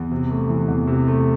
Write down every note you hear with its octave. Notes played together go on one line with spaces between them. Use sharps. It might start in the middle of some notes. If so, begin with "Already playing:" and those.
Already playing: E2
C3
A3
E3
E2
C3
A3